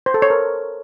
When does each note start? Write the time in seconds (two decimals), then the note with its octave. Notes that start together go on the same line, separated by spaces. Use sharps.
0.06 C5
0.14 A4
0.22 C#5
0.30 A#4